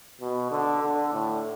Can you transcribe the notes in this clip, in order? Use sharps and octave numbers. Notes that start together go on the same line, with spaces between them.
B2
D3
D3
A2